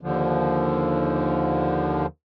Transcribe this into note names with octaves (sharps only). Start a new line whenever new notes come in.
D#2 D3 F3